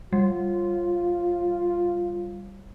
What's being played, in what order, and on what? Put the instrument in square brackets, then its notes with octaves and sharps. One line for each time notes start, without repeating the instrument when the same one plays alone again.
[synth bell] G3 [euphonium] F4